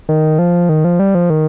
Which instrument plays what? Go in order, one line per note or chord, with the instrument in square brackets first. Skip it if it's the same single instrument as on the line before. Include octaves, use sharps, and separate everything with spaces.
[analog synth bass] D#3
F3
D#3
F3
G3
F3
D#3